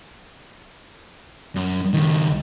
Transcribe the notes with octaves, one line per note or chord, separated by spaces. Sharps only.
F#2
C#2 D#3